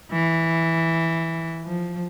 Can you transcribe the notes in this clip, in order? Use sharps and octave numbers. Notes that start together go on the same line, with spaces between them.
E3
F3